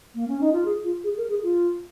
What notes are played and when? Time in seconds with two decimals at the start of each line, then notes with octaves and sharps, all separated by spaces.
0.15 A#3
0.28 C#4
0.41 D#4
0.53 F4
0.65 G#4
0.84 F4
1.04 G#4
1.18 A#4
1.30 G#4
1.43 F4